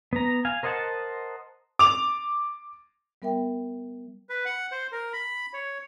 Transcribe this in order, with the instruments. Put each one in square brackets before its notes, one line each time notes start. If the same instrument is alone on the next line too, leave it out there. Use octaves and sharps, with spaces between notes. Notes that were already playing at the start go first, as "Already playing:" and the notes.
[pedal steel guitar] B3 A#5
F5 G#5
A#4 C5 D#5 F#5 A5
[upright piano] D6 F7
[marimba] G3 B3 A#4 E5 G5
[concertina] B4
F#5
C5
A#4
B5
C#5